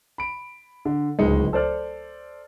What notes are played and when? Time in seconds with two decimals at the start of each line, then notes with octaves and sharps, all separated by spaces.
0.18 B5 D7
0.85 D3
1.19 D1 C#2 G#3 D#4 C#7
1.53 A4 C5 D5 F6